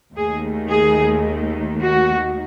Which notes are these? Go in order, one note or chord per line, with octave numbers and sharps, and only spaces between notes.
D#2 D#3 A3 G#4
G#4
F#4